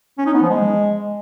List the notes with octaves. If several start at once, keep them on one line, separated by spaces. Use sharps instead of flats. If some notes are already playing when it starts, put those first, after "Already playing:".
C#4
D#4
B3
F3
G#3